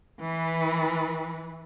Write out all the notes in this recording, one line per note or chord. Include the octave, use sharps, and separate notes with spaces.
E3 B4